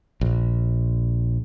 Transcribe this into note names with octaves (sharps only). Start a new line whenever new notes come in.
A#1